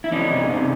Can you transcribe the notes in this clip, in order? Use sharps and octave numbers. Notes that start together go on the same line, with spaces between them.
E4
E3 C#4 D#4
C3
C3